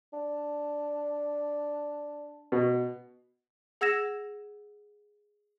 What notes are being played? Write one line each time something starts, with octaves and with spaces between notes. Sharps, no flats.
D4
B2
G#4 F#5 E6 G#6 A#6 E7